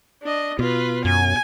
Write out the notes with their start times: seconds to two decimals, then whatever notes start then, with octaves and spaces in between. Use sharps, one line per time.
0.23 D4 D#5
0.59 B2 F4 B4
1.05 F#2 G#5